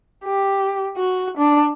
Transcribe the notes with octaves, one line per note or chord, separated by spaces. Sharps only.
G4
F#4
D4